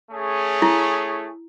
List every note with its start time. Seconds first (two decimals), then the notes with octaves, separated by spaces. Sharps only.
0.11 A3 C#4 G#4
0.62 E4